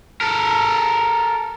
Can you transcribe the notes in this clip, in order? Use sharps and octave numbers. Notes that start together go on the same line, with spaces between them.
A4 A#4